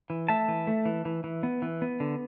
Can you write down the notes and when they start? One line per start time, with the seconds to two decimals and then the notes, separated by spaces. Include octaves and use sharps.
0.10 E3
0.28 A3 E5 A5
0.48 E3
0.67 A3
0.85 E3
1.05 E3
1.24 E3
1.43 B3
1.62 E3
1.82 B3
2.00 D3